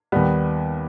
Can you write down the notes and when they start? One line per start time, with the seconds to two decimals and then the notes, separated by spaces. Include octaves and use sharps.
0.12 D#2 D#3 G3 B3